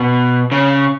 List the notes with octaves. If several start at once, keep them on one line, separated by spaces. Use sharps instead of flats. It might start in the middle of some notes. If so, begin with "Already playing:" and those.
Already playing: B2
C#3